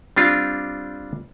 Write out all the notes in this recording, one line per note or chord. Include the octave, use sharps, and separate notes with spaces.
G3 C4 D4 F4